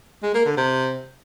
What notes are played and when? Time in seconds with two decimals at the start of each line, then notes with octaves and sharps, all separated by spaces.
0.23 G#3
0.34 A#3
0.46 D3
0.57 C3